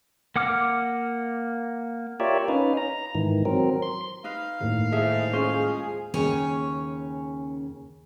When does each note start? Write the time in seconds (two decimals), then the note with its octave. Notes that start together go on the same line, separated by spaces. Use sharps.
0.36 A#3 F#5 D6 F6
2.20 F4 G4 A#4 C#5 D5 E5
2.48 C#4 D#4 B4 F5
2.77 A#5
3.15 G#2 D#3 E3
3.45 F#3 C4 A#4
3.82 C6
4.24 D#4 B4 F5
4.60 D#2 A2 A#3
4.92 G#2 D#4 E4 G#4 A4 E5
5.33 F3 G#3 C#4 F4 G#4 C5
6.14 D#2 C#3 C#4 C#5 G#5